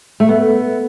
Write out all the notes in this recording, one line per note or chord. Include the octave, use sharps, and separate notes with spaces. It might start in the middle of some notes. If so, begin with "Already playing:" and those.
A3
B3